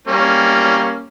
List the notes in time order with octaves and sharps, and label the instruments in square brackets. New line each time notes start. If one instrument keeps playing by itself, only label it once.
[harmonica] G3 A#3 C#4